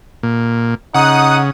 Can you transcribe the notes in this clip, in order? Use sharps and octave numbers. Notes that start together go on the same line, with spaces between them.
A#2
C#3 D#4 F#5 D#6